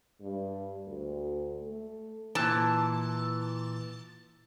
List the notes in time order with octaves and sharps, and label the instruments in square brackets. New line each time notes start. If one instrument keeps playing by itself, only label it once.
[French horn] G2
D2
A3
[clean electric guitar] A#2 E3 [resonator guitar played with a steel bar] A5